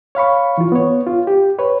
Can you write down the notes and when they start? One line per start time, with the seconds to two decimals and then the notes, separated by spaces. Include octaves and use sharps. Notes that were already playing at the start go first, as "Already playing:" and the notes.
0.15 C#5 F5 B5 C#6
0.58 E3 F4
0.72 B3 C#5
1.07 F4
1.27 G4
1.59 B4 C#5